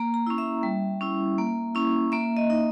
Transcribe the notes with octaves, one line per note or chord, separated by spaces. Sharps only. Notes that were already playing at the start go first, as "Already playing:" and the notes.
Already playing: A#3 A#5
A#5
C#4 E4
E5
G3
C#4 E4
A#3
C#4 E4
A#3 E5
D#5
D#4